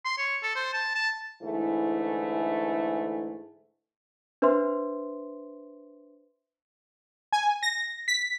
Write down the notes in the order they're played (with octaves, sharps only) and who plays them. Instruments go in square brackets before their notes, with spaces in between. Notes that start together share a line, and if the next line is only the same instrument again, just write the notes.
[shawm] C6
C#5
A4
C5
A5
A5
[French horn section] G#2 D3 E3 A3 E4
[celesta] D4 B4 C5 E5 C6
[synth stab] G#5
A#6
B6